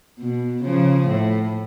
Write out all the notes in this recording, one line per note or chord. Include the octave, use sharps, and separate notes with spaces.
B2
C#3 F3
A2